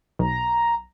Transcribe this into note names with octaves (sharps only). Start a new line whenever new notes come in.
B1 A#5